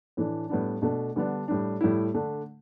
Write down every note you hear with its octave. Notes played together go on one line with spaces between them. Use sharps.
A2 E3 A3 D4
A2 G3 B3 D4
B2 A3 D4
D3 G3 B3 D4
A2 G3 D4
A2 G3 E4
D3 A3 D4